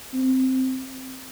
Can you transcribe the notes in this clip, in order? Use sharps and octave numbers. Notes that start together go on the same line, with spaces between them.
C4